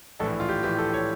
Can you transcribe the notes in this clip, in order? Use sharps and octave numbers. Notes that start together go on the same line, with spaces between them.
A#1 A2 E3 A4
F4
G4
A#1 A2 E3 G4
A4
C#5